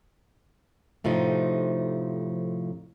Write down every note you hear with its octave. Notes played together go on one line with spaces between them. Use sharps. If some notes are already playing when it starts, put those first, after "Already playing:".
F2 A2 C3 F3 D#4